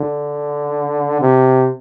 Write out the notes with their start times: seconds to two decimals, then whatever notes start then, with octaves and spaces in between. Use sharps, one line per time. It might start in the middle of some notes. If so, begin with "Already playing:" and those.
Already playing: D3
1.21 C3